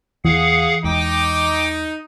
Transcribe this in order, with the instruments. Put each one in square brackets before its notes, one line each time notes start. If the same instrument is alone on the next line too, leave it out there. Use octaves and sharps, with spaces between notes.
[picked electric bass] E2 [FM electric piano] E3 [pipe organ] G#4 F5 F#5
[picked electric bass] E2 G#3 [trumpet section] D#4 [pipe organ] G5 D6